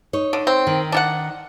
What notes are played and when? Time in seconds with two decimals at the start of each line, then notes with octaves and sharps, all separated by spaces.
0.13 D#4 C#5
0.33 D3
0.47 C4
0.67 D#3
0.92 D4 A4 F#5